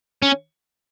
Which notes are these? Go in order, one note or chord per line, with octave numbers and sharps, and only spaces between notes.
C#4